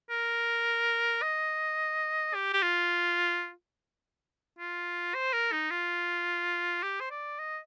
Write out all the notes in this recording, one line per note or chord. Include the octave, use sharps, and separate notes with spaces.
A#4
D#5
G4
G4
F4
F4
C5
A#4
D#4
F4
G4
C5
D5
D#5